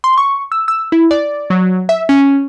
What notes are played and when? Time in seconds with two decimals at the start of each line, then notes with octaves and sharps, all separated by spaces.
0.04 C6
0.18 C#6
0.52 E6
0.68 E6
0.92 E4
1.11 D5
1.50 F#3
1.89 E5
2.09 C#4